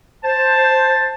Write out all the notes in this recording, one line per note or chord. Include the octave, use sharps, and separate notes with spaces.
C5 A5